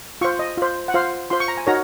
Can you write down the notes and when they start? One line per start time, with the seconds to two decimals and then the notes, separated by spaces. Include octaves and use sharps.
0.21 F4 C5 C#6
0.39 D#5
0.57 F4 C5
0.88 F#5
0.94 F4 C5 F5
1.30 F4 C5 C6
1.40 C#6
1.48 A#5
1.58 G#5
1.67 D#4 F#4 A#4 C#5 A#5